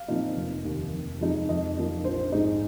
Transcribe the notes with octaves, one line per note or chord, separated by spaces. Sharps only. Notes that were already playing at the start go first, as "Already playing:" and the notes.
Already playing: F5
A#2 F3 C4 D#4
F1
D#2 D#3
F1
F2 F3 G#3 D#4
F2 D#5
F3 A#3 D#4
A#1 C5
G#2 G#3 D#4